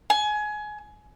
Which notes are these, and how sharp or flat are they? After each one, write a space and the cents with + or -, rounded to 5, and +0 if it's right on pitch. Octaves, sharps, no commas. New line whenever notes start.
G#5 +25